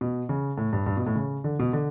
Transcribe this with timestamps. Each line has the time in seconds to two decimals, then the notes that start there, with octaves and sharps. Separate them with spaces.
0.01 B2
0.29 C#3
0.58 A2
0.73 G2
0.86 G2
0.97 B2
1.07 A2
1.15 C#3
1.44 D3
1.59 B2
1.73 D3